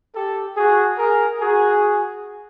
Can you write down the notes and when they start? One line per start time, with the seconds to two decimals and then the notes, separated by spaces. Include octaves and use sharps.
0.15 G4 A4
0.56 F#4 G#4
0.97 G#4 A#4
1.40 F#4 G#4